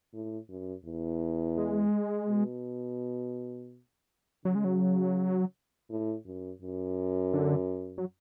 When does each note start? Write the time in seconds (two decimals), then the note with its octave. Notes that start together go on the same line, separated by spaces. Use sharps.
0.13 A2
0.49 F#2
0.85 E2
1.57 G#3
2.29 B2
4.45 C#3 F#3
4.55 G#3
4.64 F#3
5.90 A2
6.26 F#2
6.62 F#2
7.33 D3
7.98 F#3